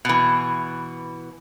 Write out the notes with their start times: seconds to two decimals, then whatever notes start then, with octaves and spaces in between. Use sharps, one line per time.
0.05 B2 E3